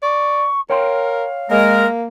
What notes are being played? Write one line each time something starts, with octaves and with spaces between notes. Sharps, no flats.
D5 C#6
A#4 C#5 F5 G5 C6
G#3 A#3 A#4